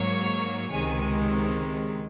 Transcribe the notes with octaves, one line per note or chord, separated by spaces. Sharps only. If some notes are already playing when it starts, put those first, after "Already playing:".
Already playing: G#2 F#3 A#3 C#5
C#2 C3 D#3 G#3 G#5